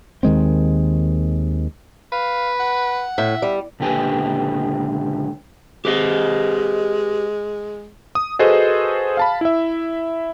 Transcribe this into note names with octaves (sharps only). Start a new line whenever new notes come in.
D#2 D#3 G#3 C4
B4 F5
F#5
A2 E5
G3
C#2 A#2 D3 G4 B4 G#5
G#3 G4 B4 D#5
D#6
F#4 G#4 A4 B4 C5 D#5
F5 A5 B5
E4 E5